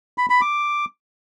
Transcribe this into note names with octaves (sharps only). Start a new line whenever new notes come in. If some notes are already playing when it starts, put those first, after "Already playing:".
B5
B5
D6